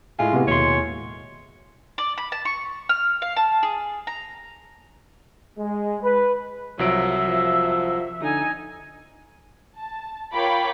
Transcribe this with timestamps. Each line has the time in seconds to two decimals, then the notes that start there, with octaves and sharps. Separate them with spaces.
0.19 A2 G#3 F4 G#5
0.33 C3 B3
0.47 D#2 B2 C#5 C6
1.98 D5
2.18 B5
2.32 A5
2.45 C#6
2.89 F6
3.22 F5
3.36 A5
3.63 G#4
4.07 A#5
5.59 G#3
6.03 B4
6.79 C2 F3 F#3 E5 D7
7.27 F3
8.21 D3 D#4 G#5
9.77 A5
10.33 F4 A#4 C#5 G5 B5 D6